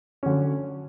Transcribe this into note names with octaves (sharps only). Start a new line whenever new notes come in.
D3 F#3 C#4